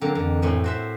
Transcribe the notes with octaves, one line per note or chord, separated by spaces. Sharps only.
D3 F#3 A#3 C4
F2 D3 E3
A2 C4 G#5
F#4 C5 E5